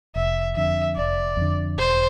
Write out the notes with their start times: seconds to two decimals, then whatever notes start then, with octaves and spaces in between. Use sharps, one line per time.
0.15 F1 E5
0.56 F2 D3 E5
0.96 F1 D5
1.37 F2 D3
1.78 E1 C5